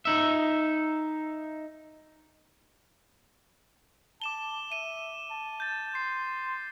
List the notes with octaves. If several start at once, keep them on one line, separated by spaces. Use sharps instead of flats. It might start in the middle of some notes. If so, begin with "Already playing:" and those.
D#4 E5
A5 D6 E7 G7
E5 D#7 E7
A5
G6 A6
C6 C7